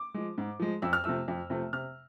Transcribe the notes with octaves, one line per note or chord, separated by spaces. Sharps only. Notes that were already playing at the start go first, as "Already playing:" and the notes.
Already playing: D6
F3 G#3
G#2
F3 G#3
F2 E6
F6
C3 F3 A3 E6
F2
C3 F3 A3
C3 F6